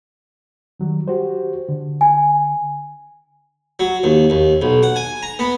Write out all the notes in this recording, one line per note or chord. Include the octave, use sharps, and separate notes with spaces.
D#3 F#3 G3
F#4 G4 C5
D3
G#5
F#3
D#2
D#2
B1
F#5
G#5
A#5
B3